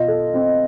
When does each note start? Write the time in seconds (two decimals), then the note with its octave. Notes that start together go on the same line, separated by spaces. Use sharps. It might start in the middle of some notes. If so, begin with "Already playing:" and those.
Already playing: B2 F4 D#5
0.08 A4
0.34 C4